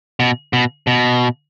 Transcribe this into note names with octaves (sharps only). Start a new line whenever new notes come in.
B2
B2
B2